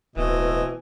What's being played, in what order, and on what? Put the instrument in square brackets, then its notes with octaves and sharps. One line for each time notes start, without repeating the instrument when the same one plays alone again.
[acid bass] D1 [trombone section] B2 [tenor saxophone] E3 [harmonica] A3 C4 D#5